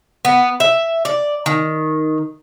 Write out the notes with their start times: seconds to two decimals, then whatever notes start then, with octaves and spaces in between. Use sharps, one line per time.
0.25 B3
0.60 E5
1.05 D5
1.46 D#3